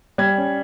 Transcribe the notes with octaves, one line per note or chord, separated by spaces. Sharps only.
G3 G#6
C#4